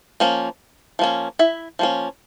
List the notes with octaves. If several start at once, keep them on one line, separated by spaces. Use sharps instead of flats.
F3 A#3 C#4
F3 A#3 C#4
E4 E5
F3 A#3 C#4